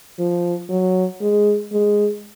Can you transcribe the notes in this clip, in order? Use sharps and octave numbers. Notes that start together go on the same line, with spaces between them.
F3
F#3
G#3
G#3